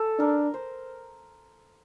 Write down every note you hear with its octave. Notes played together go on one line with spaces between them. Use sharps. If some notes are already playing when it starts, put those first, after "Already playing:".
Already playing: A4
D4 A#4
C5